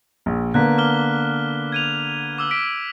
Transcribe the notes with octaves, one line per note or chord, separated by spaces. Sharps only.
A#1
D3 A#3 B3 F#6 B6
D6 F6 G7
G#6 D#7 F7
D6 E6 G7
B6 D7